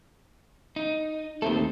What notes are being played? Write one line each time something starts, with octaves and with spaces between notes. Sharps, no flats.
D#4
D#2 D#3 A3 C4 A4